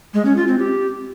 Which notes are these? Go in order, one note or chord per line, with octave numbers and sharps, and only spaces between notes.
G#3
C#4
F4
C4
G4